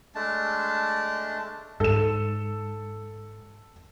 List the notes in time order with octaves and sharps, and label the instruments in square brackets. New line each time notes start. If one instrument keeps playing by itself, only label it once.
[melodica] G#3 A3 D4 A5
[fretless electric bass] G#2 [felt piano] A4 E7